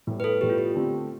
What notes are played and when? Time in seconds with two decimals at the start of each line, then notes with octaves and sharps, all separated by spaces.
0.07 A2 G3 B3
0.20 B4
0.24 A4
0.41 A2 G3 B3 G4
0.49 F4
0.58 G4
0.75 D3 A3 C4 G4